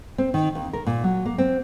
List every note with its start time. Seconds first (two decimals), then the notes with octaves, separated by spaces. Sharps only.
0.18 C4
0.34 D#3
0.55 D#2
0.73 A#4
0.87 A#2
1.04 F#3
1.25 A#3
1.38 C4